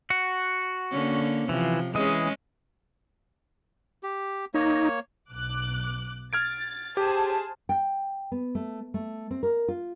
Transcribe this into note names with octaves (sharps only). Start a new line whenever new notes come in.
F#4 F#5
D3 A#3 C#4
C3 E3 F3
E3 G#3 C#4 G#4 D#5
G4
A#3 D#4 C#5
B1 D6 F#6
F6 G#6 A6 D7
G4 G#4 C5 A5
G5
B3
A3
A3
C4
A#4
F4